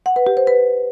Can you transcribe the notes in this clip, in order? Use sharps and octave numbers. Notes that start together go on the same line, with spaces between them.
F#5
B4
G4
C5
B4